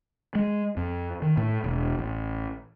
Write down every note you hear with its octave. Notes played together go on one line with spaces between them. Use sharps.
G#3
F2
D#3
A2
E1
A1